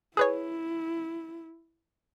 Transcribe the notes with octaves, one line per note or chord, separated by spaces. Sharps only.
E4 G#4 B4 C#5